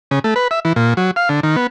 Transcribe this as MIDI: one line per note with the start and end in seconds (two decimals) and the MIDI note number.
0.11 0.19 49
0.24 0.34 57
0.36 0.48 71
0.51 0.60 76
0.65 0.73 52
0.76 0.94 46
0.97 1.11 54
1.16 1.29 77
1.29 1.40 50
1.43 1.56 51
1.56 1.67 59